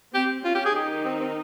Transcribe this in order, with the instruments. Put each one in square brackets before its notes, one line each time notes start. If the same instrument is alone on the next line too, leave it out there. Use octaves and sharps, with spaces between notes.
[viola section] C4 [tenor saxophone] G4
[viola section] C#4 [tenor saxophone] F4
[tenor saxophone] G4
G#4
[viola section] D#3 D#4 [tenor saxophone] G4
[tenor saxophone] C4
C4